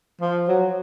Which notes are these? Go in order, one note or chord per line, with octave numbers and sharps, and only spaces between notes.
F3
F#3